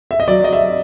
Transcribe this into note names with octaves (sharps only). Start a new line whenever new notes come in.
E5
D#5
F#3 D5
D#5
E5